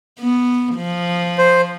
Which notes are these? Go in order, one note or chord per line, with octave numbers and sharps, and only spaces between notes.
B3
F3
C5